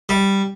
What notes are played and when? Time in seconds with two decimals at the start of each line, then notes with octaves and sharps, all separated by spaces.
0.09 G3